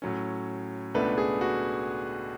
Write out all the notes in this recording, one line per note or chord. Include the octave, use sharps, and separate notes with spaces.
A2 F#3 C#4
C#2 B2 A3 D4 B4
G#4
F#4